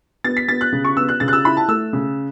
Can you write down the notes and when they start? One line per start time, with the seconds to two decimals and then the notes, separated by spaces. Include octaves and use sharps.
0.24 B3 A6
0.37 B6
0.48 B3 A6
0.61 F#6
0.72 C#3
0.85 C#6
0.97 B3 E6
1.08 F#6
1.20 C#3 A6
1.28 F#6
1.33 E6
1.45 E4 B5
1.57 A5
1.68 A3 E6
1.93 C#3